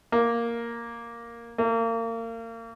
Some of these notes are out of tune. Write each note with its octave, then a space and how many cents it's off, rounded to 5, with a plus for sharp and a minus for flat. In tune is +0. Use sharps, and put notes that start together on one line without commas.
A#3 +0
A#3 -35